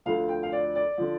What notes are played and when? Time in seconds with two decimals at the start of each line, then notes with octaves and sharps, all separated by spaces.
0.06 D2 D3 F3 F5
0.28 G5
0.43 F5
0.52 D5
0.75 D5
0.98 D3 F3